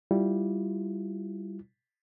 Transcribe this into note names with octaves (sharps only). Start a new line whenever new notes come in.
G3 E4 F4